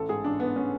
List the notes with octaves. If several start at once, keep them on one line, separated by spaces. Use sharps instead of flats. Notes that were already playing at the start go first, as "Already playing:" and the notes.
Already playing: A1 A4
G#2 G#4
A1 D4
A1 B3
C#4